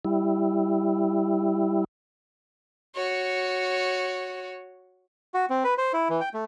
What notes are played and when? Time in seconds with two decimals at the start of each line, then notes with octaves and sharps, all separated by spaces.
0.05 G3 E4
2.95 F#4 C#5
5.34 F#4
5.50 C4
5.64 B4
5.78 C5
5.93 E4
6.10 E3
6.21 G5
6.34 A3